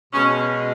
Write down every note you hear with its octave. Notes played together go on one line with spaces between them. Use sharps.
B2 G#3 C#4